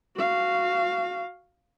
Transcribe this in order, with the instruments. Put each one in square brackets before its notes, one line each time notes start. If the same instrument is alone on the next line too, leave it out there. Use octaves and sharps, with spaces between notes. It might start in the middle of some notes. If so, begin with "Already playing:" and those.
[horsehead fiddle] F#4 F5